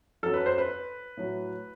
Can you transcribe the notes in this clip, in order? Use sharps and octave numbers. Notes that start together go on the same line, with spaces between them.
F#2 F#3 A4
B4
C5
B4
A2 F#3